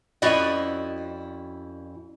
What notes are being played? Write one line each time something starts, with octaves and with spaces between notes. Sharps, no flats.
F2 C#4 E4 F#4 D5 D#5